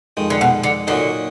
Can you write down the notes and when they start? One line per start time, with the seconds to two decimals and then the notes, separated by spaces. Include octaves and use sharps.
0.17 F2 D#3 G#3
0.30 D3
0.41 B2
0.63 D3
0.87 A#2 D3 F#3 A#3 D#4